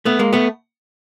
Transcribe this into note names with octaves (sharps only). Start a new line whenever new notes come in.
A3 B3
G#3 A#3
A3 B3